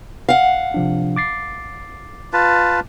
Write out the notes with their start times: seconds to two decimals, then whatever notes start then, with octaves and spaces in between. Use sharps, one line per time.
0.29 F5 F#5
0.74 C3 F3 D4
1.16 D6 A6 C7
2.33 F4 B4 A5